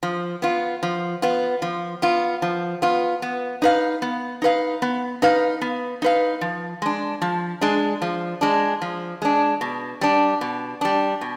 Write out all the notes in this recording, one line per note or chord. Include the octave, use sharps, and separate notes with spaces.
F3
B3 F4
F3
B3 F4
F3
B3 F4
F3
B3 F4
B3
D#4 B4 F5
B3
D#4 B4 F5
B3
D#4 B4 F5
B3
D#4 B4 F5
F3
G#3 D4
F3
G#3 D4
F3
G#3 D4
F3
G#3 D4
B2
G3 D4
B2
G3 D4
B2